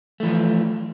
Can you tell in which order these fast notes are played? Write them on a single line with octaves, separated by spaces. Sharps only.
A3 E3 F3